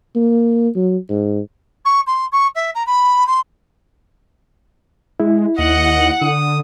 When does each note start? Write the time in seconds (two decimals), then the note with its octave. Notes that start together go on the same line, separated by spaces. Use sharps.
0.16 A#3
0.76 F#3
1.10 G#2
1.85 C#6
2.07 C6
2.32 C#6
2.55 E5
2.74 A#5
2.86 B5
3.27 C6
5.20 G#3 E4
5.59 D#2 D#5 F#5
6.21 D3 D#6